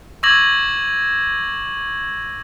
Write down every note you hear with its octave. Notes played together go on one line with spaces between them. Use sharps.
C#6 D6 E6 G#6 A#6 F#7